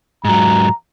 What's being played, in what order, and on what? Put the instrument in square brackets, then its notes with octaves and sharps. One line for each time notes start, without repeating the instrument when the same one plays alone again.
[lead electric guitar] G#2 F#3 [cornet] A#5